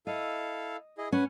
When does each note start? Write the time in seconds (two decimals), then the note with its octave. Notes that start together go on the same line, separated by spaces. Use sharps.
0.07 E4 A4 D#5 F5
0.98 E4 G#4 D#5
1.12 C#4 B4 F#5